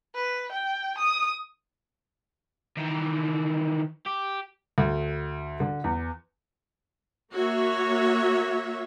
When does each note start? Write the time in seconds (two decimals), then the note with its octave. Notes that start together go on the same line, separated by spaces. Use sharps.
0.15 B4
0.52 G5
0.98 D#6
2.77 D#3 E3
4.06 G4
4.78 D2
5.60 D3
5.84 E2
7.33 A#3 F#4 C#5 E5